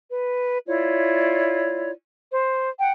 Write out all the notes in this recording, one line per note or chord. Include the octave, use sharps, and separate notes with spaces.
B4
E4 F4 C#5 D5
C5
F#5 G5